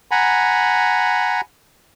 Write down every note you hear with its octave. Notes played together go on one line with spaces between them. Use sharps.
F#5 G#5 A#5 B5